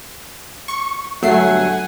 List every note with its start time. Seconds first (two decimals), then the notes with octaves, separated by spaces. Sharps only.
0.68 C#6
1.23 G1 F#3 A3 A4 E5 F#5 G#5 C7